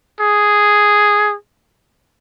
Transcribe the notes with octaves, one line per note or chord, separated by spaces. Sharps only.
G#4